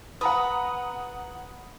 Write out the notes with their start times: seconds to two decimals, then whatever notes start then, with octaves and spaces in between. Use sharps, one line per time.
0.21 B4 F#5 A#5 D#6